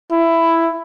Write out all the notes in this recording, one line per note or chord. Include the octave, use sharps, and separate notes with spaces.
E4